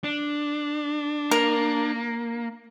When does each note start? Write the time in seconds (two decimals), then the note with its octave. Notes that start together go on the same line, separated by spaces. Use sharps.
0.04 D4
1.31 A#3 A#4